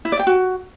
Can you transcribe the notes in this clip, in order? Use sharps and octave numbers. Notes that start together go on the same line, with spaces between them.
E4
D5
G5
F#4